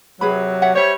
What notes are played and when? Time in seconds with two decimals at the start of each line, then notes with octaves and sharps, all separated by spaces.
0.21 C3 F#3 G#4 B4 B5
0.62 C#5 E5 F#5
0.75 G3 C5 C#5 E5